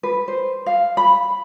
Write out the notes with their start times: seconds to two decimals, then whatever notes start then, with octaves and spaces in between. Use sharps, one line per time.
0.03 B4
0.28 C5
0.66 F5
0.97 B5